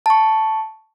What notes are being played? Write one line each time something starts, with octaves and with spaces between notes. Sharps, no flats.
A5 C#6